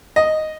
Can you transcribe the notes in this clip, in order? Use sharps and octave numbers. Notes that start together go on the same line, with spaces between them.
D#5